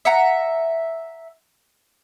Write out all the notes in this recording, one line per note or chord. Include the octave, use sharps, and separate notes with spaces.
E5 F#5 A#5